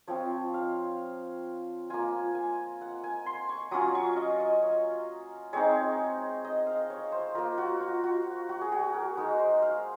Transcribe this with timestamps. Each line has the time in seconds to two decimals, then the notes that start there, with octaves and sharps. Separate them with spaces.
0.08 F3 C4 F4 C#5
0.54 F5
1.90 A#3 F4 G#5
2.35 G#5
2.81 F#5
3.04 G#5
3.26 C6
3.49 C#6
3.71 F#3 C#4 F4 D#6
3.95 C#6
4.17 D#5
4.40 D#5
4.62 C#5
5.53 G#3 C4 D#4 C#5
6.45 D#5
6.67 F5
6.90 C#5
7.12 C5
7.35 A#3 F4 A#4
7.58 F#4
7.80 F4
8.04 F#4
8.49 F#4
8.61 G#4
8.72 F#4
8.94 A#4
9.17 G#3 D#4 A#4
9.39 C5
9.62 F5